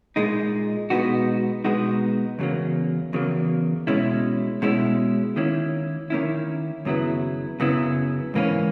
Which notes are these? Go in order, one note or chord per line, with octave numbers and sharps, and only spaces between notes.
A#2 G#3 D#4
B2 G#3 B3 D#4 F#4
B2 G#3 B3 D#4 F#4
E2 C#3 F#3 A#3
E2 C#3 F#3 A#3
B2 G#3 C#4 E4
B2 G#3 C#4 E4
D#3 A#3 C#4 E4
D#3 A#3 C#4 E4
F#2 C#3 F#3 B3 E4
F#2 C#3 F#3 B3 E4
G#2 E3 A#3 C#4